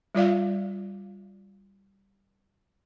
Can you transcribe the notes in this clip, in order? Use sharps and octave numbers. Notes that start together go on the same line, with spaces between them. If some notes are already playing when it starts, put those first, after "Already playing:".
G3 F4 D5 F5